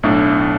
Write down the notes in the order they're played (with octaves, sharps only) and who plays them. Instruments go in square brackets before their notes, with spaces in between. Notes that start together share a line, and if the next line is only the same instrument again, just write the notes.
[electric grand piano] B1 A2 A3 D4 A4